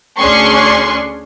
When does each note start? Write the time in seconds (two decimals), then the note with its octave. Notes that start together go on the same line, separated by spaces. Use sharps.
0.18 D2 C#4 D4 G#4 C6 C#6